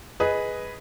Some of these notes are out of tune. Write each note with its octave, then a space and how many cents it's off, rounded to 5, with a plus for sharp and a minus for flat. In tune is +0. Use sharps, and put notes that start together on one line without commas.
G#4 +0 B4 +0 D#5 +5